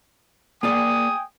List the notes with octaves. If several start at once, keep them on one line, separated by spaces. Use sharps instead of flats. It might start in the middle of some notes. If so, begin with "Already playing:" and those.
A#3 G#4 D5 G5 G#5 D#6